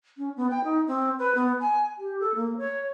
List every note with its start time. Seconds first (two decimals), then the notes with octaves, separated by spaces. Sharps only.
0.18 C#4
0.37 B3
0.50 G5
0.64 D#4
0.87 C4
1.19 B4
1.35 B3
1.60 G#5
1.98 G4
2.20 A4
2.35 A#3
2.58 C#5